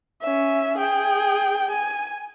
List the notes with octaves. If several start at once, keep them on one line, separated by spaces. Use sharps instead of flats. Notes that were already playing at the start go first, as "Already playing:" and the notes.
C#4 E5
G#4 G5
G#5